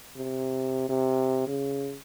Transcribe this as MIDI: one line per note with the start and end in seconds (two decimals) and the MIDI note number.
0.16 0.87 48
0.89 1.43 48
1.47 1.96 49